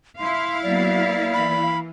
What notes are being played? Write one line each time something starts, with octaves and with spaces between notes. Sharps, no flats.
E4 F5 C6
F#3 A#3 B3 D5
A#3
E3 B5